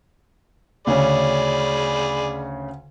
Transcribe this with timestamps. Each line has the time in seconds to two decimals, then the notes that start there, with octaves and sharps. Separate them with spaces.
0.87 D2 C#3 C#4 G#4 D5 B5